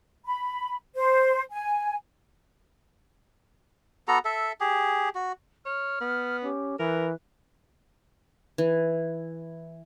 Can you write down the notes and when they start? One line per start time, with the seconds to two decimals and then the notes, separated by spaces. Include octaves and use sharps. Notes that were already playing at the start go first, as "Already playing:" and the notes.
0.25 B5
0.96 C5
1.51 G#5
4.08 B3 F#4 A4 A#5
4.25 A4 E5
4.60 G4 G#4
5.15 F#4
5.65 C#5 F6
6.01 B3
6.43 C#4 G4
6.79 E3 A#4 B4
8.58 E3